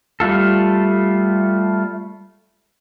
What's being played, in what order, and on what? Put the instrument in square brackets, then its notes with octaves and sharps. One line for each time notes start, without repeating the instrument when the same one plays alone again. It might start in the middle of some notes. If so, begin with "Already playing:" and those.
[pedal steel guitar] G3 A3 F4 A4